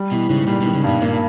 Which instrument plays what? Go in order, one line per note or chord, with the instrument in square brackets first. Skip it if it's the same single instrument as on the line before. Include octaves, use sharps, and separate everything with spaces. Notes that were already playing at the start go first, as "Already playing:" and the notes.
Already playing: [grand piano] G3
[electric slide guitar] B2 [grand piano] E3
[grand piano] G#2 [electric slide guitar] C#3
[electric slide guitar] A#2 [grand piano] G3
[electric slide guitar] B2 [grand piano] D#3
[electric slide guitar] C#3
[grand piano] G2 [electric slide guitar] B2
[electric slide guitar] A#2 [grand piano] A#3